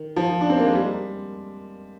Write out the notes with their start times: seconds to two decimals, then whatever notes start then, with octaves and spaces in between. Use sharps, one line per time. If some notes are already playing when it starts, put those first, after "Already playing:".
Already playing: D#3
0.16 F3
0.41 D4
0.50 C4
0.58 A#3
0.66 G#3
0.75 G3